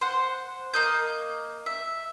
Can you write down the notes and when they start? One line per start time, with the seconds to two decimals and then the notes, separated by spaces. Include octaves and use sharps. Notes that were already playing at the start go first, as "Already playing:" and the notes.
0.01 C5 F#5
0.74 A#3 D#5 G6
1.66 E5